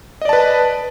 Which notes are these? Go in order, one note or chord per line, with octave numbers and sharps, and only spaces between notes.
B4 D5 D#5 A5